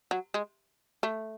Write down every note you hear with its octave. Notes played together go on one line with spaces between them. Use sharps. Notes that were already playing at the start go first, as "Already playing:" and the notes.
F#3
G#3
A3